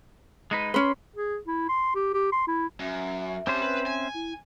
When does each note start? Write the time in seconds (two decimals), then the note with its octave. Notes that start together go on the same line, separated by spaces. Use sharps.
0.51 G#3 D#4 B4
0.74 C#4 B4 C6
1.16 G#4
1.47 E4
1.69 C6
1.95 G4
2.14 G4
2.32 C6
2.47 E4
2.80 F#2 E5
3.47 C4 C#4 G4 C5 A5
3.62 B4
3.86 G#5
4.14 E4